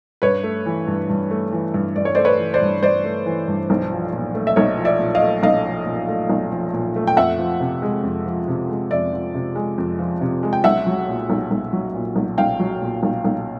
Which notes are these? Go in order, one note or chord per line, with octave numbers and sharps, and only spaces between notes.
G2 B4 C#5
A3
E3
G2
G2
A3
E3
G2
G2 D5
C#5
C5 D5
A3
B4 C#5
E3
C5 D5
G2
G2 C5 D5
A3
E3
G2
B1
F3
A#2
A3
E5
B1 C#5 D#5
F3
D5 E5
A#2
D#5 F5
A3
B1 D#5 F5
F3
A#2
A3
B1
F3
A#2
A3
G5
F2 E5 F#5
F3
C3
G#3
F2
F3
C3
G#3
F2 D5 E5
F3
C3
G#3
F2
F3
C3
G#3
G5
B1 E5 F#5
F#3
A#2
B1
B1
F#3
A#2
B1
B1 F5 G5
F#3
A#2
B1
B1